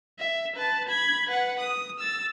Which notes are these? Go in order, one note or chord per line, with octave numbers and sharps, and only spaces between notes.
E5
B4 A5
B5 G#6
B4 F#5
D#6
E6 A6